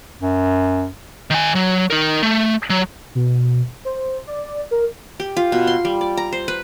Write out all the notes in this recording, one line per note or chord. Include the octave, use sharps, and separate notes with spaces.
F#2
D#3 G#5
F#3
D#4 A#4
A3
F#3
B2
C5
D5
A#4
G4
F4
B2
C6
G3
D5
A#5
C5
B4